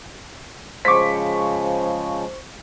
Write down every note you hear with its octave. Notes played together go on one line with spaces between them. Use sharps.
C#3 F3 G#3 C5 C#6 D6 B6